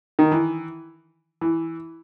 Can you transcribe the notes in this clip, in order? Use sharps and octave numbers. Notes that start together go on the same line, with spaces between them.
D#3
E3
E3